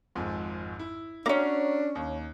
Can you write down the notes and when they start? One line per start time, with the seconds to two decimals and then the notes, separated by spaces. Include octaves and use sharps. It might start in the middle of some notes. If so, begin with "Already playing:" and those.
0.15 G#1 F2 G#2
0.79 E4
1.26 A#3 C#4 D4 F#4 A#5
1.95 D#2